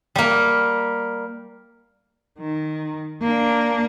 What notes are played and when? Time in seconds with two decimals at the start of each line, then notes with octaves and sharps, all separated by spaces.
0.16 G3 A#3
2.39 D#3
3.22 A#3 D4